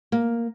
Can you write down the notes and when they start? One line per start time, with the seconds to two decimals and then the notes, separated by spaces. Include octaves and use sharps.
0.12 A#3